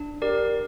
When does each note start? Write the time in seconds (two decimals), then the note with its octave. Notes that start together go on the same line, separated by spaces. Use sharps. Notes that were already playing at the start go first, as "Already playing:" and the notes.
Already playing: D4
0.22 G4 A#4 D5